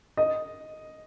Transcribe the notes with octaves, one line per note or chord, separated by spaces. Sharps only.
D#5